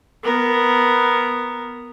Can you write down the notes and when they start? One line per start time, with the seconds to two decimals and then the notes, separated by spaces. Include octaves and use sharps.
0.23 B3 A#4